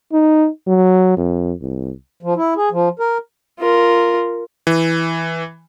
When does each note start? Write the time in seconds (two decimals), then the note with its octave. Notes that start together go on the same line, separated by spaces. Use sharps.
0.12 D#4
0.67 F#3
1.17 F2
1.61 C2
2.23 F3
2.37 E4
2.57 G#4
2.72 F3
2.99 A#4
3.60 F4 A#4
4.67 E3